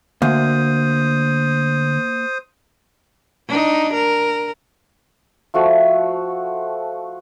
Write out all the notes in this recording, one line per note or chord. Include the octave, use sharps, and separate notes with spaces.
D2 A#3 C5 D#6
D4 D#4
A#4
F3 A3 F#4